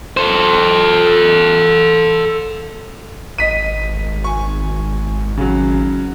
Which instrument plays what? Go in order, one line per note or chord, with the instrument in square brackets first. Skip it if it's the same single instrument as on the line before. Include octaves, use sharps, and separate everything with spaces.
[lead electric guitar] A4 C5
[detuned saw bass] G#1 [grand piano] D#5 B6 D#7
[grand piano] G#5 C#6
C#3 F#3